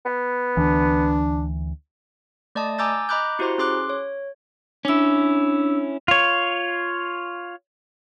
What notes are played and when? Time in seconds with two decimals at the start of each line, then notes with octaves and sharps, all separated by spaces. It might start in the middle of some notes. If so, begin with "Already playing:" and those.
0.06 B3
0.57 D2 E3 D4
2.55 A3 D5 D#5 A5 D#6
2.78 G#5 A#5 D6 E6 G6 A6
3.09 D#5 A#5 B5 D6 F#6 G6
3.39 E4 F#4 G4 C5 A#5 C6
3.58 C#4 G#4 C6 D6 F#6
3.89 C#5
4.85 C#4 D4 E4 E6
6.08 F4 C#5